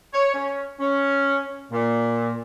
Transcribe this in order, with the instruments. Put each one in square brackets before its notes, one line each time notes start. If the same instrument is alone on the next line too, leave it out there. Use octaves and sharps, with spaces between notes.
[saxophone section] C#5
C#4
C#4
A#2